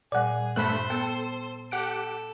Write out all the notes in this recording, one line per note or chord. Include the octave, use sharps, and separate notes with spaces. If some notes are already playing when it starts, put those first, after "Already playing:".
A#2 G3 G#4 D5 F#5
G2 A3 C5 B5 F#6
B3 A4 G5
G4 A4 F#5 D7